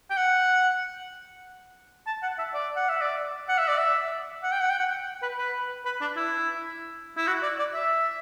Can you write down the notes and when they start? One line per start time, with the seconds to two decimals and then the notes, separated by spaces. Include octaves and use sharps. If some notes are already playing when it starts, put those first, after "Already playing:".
0.10 G5
0.17 F#5
2.07 A5
2.23 F#5
2.38 E5
2.54 D5
2.76 F#5
2.89 E5
3.01 D5
3.49 F#5
3.58 E5
3.68 D5
3.78 E5
4.43 F#5
4.52 G5
4.61 F#5
4.70 G5
4.79 F#5
5.22 B4
5.38 B4
5.85 B4
6.01 D4
6.17 E4
7.17 E4
7.27 F#4
7.43 D5
7.59 D5
7.74 E5